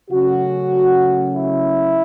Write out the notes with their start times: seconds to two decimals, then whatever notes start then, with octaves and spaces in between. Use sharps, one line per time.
0.10 C#3 F#3 A3 C#4 F#4
1.35 E4